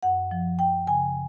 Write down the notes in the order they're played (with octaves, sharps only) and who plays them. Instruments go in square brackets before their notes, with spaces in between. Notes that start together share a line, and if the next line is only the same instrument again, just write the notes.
[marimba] F#2 F#5
F3
F3 G5
C#3 G#5